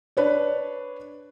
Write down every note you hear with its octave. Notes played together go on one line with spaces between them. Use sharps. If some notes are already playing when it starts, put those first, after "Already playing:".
D4 B4 C#5 D5